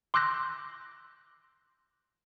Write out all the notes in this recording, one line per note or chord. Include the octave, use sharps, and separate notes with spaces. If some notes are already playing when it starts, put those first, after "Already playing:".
C6 D6 E6 F#6 G6 A#6